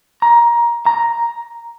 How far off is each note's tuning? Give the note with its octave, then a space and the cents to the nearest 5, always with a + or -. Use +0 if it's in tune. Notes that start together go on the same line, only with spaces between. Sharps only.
A#5 +15
A#5 +5